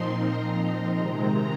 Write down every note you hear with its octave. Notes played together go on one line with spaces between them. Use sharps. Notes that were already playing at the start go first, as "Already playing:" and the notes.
Already playing: A#2 F3 C4 D#4 C6
A#5
C3 D#3 G#3 C4